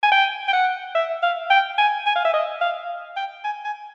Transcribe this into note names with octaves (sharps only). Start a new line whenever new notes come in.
G#5
G5
G5
F#5
E5
F5
G5
G#5
G#5
F5
E5
D#5
F5
G5
G#5
G#5